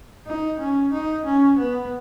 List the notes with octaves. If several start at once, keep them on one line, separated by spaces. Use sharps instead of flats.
D#4
C#4
D#4
C#4
B3